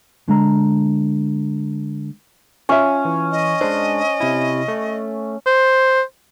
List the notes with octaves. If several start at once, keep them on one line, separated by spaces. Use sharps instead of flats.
D3 G#3 A#5
C#4 F4 E5
E3
D#5
G#3 D4 C5
C3 E4
A3
C5